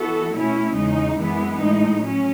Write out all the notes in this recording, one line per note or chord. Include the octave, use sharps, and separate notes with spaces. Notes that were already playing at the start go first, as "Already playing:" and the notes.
Already playing: E3 B3 F#4 A4
B2 A3 C#4 E4
E2 C#3 G#3 D#4
F#2 E3 G#3 B3
A2 G#3 D#4
F#3 C#4